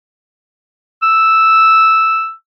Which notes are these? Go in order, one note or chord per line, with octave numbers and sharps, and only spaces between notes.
E6